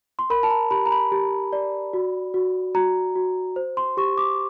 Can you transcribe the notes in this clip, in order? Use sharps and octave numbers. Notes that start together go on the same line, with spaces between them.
C6
A#4 B5
A5
A#5
G4 B5
A#5
B5
G4
D5
F#4
F#4
F#4 A#5
F#4
C5
C6
G4 C#6
D6